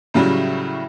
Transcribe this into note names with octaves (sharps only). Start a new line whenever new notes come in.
A2 C#3 F#3 G3